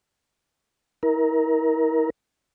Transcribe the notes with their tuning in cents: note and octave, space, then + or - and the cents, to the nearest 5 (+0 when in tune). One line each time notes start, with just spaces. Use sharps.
E4 -40 A#4 +15